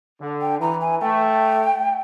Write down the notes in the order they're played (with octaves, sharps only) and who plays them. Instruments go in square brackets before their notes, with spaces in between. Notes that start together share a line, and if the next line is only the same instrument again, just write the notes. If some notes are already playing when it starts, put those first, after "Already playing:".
[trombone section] D3
[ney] G5
[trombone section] E3 [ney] A#5
[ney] G#5
[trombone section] A3 [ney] G5